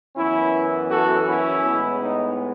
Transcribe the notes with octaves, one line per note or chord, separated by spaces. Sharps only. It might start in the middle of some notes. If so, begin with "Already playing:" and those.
F#2 E3 B3 C#4 E4
F#4 A4
C#4 E4
A2 G#3 B3
D#4